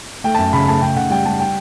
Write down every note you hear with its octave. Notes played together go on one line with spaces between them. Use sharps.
A3 G5
F#2 A5
C#3 B5
A3 A5
C#3 G5
C#3 F#5
G3 G5
G3 A5
G5